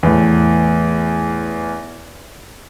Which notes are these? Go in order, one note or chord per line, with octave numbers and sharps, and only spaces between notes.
E2 A2